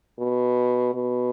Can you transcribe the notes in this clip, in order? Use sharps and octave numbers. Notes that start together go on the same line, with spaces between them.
B2
B2